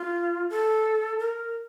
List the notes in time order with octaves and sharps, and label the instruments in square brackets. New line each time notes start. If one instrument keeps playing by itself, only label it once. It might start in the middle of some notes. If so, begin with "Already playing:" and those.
Already playing: [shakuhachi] F4
A4
A#4